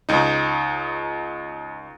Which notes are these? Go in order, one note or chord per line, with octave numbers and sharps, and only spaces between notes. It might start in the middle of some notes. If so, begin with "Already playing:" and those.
C#2 D#4